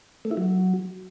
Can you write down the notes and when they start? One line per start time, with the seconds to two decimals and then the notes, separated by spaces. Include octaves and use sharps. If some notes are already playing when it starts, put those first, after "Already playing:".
0.25 A3
0.31 E4
0.37 F#3